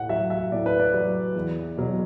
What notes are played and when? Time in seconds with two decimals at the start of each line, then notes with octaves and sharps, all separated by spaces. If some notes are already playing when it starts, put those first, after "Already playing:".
Already playing: A2 F#5
0.09 F#3 E5
0.30 E5
0.52 A2 D5
0.66 B4
0.80 D5
0.94 F#3
1.34 E2
1.77 B2 F#3